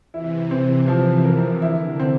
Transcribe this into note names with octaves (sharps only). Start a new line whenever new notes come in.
C3 E3 E4
C4
F3
A#4
D3 E4
C4